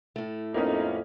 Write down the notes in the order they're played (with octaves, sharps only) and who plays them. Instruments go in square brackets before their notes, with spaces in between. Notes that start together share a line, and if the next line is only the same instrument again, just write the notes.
[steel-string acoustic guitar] A2 A3
[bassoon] F2 [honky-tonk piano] A#3 B3 C#4 [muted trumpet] D#4